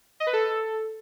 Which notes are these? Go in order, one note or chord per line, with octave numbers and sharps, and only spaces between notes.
D#5
B4
A4